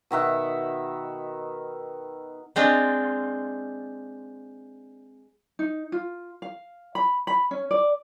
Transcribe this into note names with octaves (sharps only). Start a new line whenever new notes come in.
B2 D#3 E5 F#5
G#3 C4 D4 F4
D#4
F4
F5
B5
B5
C#4
D5